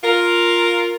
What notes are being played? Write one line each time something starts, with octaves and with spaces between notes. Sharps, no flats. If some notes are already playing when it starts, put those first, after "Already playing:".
F4 A#4